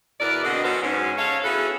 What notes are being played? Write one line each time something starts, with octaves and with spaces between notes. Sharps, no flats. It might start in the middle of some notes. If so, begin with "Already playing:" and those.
E2 B2 A#4 B4 D5
B2 D3 C4 F#4 D#5
F#3 B3 C#4 A4 B4 C5
G#2 C#4
A4 C#5 F5
B3 C#4 E4 F#4 G#4 A4